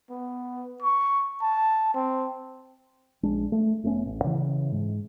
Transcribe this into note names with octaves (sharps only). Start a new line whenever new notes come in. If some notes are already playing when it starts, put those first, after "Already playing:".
B3
C#6
A5
C4
A#1 G#3 D4
A3
F1 A3 B3 C#4
A1
C#3 E3
G#2